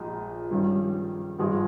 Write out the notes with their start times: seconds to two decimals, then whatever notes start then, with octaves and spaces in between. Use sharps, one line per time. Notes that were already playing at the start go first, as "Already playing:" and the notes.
Already playing: A#1 A#2 G#3 D#4 G#4
0.50 G2 D#3 G3 C#4
1.39 G#1 G2 F3 G#3